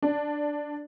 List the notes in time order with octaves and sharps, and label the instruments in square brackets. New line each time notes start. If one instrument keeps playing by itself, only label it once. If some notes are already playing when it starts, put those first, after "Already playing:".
[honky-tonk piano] D4